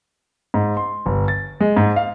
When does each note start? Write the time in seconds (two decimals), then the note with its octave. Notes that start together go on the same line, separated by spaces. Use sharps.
0.54 G#2
0.77 C6
1.06 G1
1.28 A6
1.60 G#3
1.77 G#2
1.96 F5